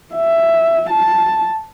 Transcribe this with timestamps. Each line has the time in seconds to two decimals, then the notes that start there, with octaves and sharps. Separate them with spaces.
0.15 E5
0.90 A5